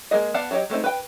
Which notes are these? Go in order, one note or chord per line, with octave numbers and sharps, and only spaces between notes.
G#3 A#3 G#4 D#5
B3 D5 F5 F#5 A5
F#3 F#4 G4 C#5 D#5
G#3 A3 C4 D#4
B4 G5